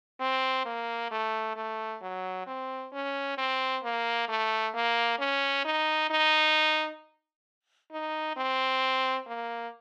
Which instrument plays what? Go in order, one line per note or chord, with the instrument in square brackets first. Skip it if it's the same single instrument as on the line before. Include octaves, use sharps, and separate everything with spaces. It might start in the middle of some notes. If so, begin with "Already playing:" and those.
[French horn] C4
A#3
A3
A3
F#3
C4
C#4
C4
A#3
A3
A#3
C#4
D#4
D#4
D#4
C4
A#3